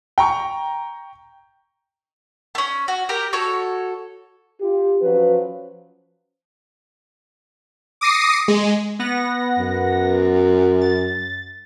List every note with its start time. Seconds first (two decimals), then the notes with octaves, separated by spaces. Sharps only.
0.18 G5 A#5 C#6
2.55 A3 C#4
2.88 F#4
3.09 G4 A#4 A#5
3.33 F#4 A4 C#5
4.60 F4 G4
5.01 F3 F#3 C#4 B4
8.01 D6 D#6 A#6 C7 C#7
8.48 G#3
8.99 B3 F#5 A#6
9.59 F#2
10.81 A6